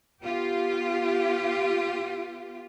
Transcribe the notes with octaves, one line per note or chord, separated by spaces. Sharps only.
B3 F4 G4